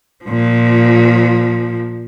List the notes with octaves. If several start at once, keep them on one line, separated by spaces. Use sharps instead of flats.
A#2 F3